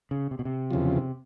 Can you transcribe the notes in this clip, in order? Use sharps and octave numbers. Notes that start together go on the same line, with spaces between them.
C#3
C3
B2
C3
E2 C#3 F3